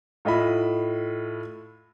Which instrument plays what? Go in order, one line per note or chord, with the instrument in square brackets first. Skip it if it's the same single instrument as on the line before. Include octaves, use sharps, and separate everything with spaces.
[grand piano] A2 F4 D#5 E5 B5